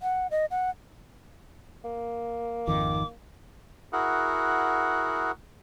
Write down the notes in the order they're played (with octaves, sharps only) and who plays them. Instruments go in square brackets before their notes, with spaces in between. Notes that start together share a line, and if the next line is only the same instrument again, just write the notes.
[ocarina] F#5
D#5
F#5
[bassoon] A#3
[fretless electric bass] G#1 F2 D#3 [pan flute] D6
[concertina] E4 F#4 G#4 A#4 F#5